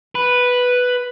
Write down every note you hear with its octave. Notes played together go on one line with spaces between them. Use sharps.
B4